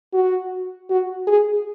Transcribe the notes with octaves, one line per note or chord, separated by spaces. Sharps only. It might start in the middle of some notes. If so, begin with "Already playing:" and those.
F#4
F#4
G#4